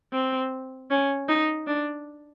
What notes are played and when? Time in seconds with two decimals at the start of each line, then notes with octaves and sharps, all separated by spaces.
0.13 C4
0.90 C#4
1.28 D#4
1.67 D4